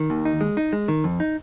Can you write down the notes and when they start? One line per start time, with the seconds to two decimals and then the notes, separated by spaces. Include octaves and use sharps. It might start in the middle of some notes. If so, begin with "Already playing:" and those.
Already playing: D#3
0.10 D#2
0.25 D#4
0.41 G#3
0.57 D#4
0.73 G#3
0.88 D#3
1.04 F2
1.20 D#4